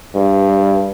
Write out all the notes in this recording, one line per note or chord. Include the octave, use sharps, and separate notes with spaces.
G2